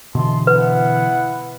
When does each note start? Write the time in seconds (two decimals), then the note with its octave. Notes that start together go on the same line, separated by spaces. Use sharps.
0.15 B2 D3 E3 D#5 A5 C6
0.47 B3 E4 B4 F#5